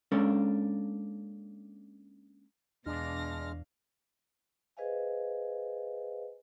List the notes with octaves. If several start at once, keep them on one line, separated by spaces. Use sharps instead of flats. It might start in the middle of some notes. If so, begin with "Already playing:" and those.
G#3 A#3 C#4 D4 A4 A#4
E2 B2 G#3 D4 F5 F6 A#6
G#4 B4 C5 D#5 F5 G#5